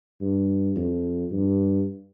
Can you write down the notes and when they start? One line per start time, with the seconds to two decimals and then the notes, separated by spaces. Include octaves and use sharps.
0.21 G2
0.76 F2
1.32 G2